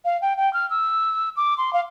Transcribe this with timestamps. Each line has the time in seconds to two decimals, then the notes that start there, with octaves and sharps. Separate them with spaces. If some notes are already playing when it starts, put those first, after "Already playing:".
0.05 F5
0.22 G5
0.37 G5
0.53 F6
0.70 E6
1.37 D6
1.58 C6
1.73 F5